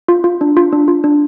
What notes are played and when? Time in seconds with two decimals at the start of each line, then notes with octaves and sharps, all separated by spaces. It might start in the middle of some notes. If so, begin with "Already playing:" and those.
0.08 F4
0.24 F4
0.41 D4
0.57 F4
0.72 D4
0.88 F4
1.04 D4